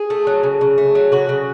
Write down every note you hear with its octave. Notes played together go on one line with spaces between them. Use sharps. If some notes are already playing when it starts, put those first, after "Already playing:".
Already playing: G#4
A3
F#3
C#3
C#3
A3
F#3
C#3 F#4
C#3